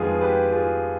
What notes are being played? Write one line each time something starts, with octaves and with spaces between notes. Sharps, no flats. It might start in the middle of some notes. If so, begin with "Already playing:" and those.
Already playing: F2 D#3 G#3 B3 F4 G#4
G4 B4
F4 G#4